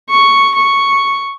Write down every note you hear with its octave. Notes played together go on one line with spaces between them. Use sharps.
C#6
C#6